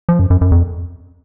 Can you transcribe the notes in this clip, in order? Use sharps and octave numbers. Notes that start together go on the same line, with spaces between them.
F3
F#2
F#2
F#2
F2